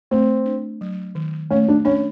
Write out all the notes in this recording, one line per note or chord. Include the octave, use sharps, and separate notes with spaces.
A3 C4
D4
F#3
D#3
A3 C#4
D4
C#4 D4